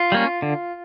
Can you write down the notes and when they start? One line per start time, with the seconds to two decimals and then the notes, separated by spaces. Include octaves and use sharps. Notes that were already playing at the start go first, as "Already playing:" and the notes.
Already playing: F4
0.12 G3 A#3 C#4
0.42 D3